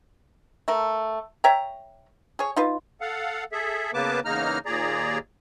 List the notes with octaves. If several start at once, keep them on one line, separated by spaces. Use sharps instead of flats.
A3 A#4
C#5 E5 G5 A#5
G#4 C#5
D#4 F4 B4
A4 F5 F#5
G#4 A4 E5
C#3 A#3 B3 B4 A5 D6
E2 C#3 A#3 D#4 A#5 F6
D#2 A#2 G#4 D5 A#5